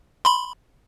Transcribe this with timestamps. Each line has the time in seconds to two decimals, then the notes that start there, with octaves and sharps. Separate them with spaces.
0.25 B5 C6